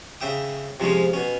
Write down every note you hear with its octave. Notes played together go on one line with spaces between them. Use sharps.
C#3 E5 G5 D#6
C3 F3 G#3 C#4
B2 C#4